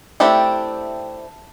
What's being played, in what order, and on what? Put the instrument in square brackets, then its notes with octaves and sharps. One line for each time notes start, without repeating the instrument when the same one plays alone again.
[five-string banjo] A3 C4 D4 E4 G4